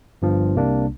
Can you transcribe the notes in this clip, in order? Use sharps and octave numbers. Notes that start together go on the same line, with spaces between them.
G1 G2 F3
C2 C3 A#3 D4